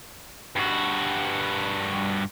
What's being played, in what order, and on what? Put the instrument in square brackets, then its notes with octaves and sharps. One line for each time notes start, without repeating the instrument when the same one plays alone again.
[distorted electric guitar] G2 F#4